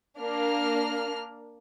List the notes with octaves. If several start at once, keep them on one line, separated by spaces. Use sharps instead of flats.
A#3 D4 F6